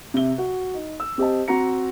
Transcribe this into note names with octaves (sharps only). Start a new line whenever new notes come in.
C3 E5 G7
F#4
D#4
E6
C4 G4 C5 D#5 A5
C4 F#4 A#5 C#7